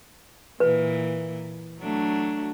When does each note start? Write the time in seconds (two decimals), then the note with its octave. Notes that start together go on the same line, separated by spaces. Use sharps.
0.60 A#2 E3 B4
1.80 F#3 A3 D4